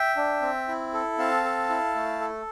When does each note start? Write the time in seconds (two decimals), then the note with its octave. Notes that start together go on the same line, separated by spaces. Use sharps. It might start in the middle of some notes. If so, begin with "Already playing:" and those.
Already playing: E5 G5
0.17 D4
0.42 C4
0.68 E4
0.93 A4
1.18 C4 F5 A5
1.44 A4
1.69 E4
1.95 A3
2.21 A4